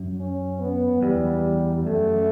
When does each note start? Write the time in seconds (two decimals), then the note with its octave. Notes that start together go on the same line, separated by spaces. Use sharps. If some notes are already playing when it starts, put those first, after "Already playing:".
Already playing: F#2
0.20 C#4
0.60 B3
1.02 E2 G3
1.86 F#2 A3